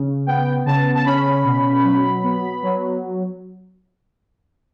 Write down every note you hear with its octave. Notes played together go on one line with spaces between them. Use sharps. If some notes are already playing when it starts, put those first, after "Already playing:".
Already playing: C#3
B3 G5
C#3 A5
A5
C#4 B5
B2
F#3
B3
F#3